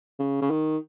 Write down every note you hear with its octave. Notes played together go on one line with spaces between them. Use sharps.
C#3
C#3
D#3